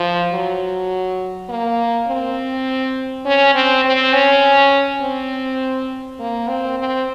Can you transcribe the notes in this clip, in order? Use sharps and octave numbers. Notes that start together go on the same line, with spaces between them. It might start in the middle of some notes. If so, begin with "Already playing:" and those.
Already playing: F3
F#3
A#3
C4
C#4
C4
C4
C#4
C4
A#3
C4
C4